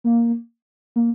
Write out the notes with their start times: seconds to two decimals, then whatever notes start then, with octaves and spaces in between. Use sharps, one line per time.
0.04 A#3
0.96 A#3